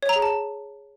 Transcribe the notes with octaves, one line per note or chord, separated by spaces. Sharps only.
C#5
A#5
G#4
A5